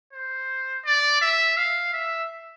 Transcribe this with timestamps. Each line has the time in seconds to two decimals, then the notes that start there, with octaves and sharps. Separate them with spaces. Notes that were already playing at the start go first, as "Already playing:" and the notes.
0.13 C5
0.85 D5
1.21 E5
1.57 F5
1.93 E5